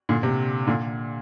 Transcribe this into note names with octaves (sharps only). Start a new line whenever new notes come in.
A#2 D3
C3
A#2 D3